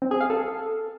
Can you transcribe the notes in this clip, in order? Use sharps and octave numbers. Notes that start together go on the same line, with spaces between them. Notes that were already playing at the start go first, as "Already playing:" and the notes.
C4
G#4
F5
A4